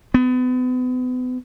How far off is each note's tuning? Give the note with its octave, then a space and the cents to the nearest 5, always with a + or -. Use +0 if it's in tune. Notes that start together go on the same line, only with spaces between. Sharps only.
B3 +35